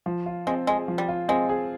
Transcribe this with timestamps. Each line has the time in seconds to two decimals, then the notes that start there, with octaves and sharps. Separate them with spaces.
0.06 F3
0.26 F4
0.47 G#3 C4
0.67 G#3 G#4
0.88 F3
0.98 G3
1.08 F4
1.28 G#3 C4
1.49 G#4